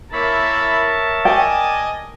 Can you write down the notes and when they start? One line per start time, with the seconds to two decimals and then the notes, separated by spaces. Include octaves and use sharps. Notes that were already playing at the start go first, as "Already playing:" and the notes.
0.13 A#3 E4 A#4 C#5 E5 A5 B5
1.25 D5 D#5 G5 G#5